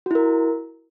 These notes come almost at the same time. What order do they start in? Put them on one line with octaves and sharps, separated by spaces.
F#4 E4 A#4